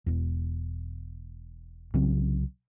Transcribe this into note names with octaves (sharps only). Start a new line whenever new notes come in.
E1 E2
C2 C#3 F#3 C4